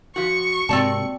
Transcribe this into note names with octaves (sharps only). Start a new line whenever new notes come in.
F3 F#4 C#6
G#2 C3 A#3 C4 D5 A5